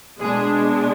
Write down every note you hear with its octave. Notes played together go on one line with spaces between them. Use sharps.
B2 G#3 D4 G#4